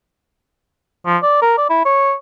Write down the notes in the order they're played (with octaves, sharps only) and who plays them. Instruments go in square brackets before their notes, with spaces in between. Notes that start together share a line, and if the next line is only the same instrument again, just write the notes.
[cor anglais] F3
D5
A#4
D5
E4
C#5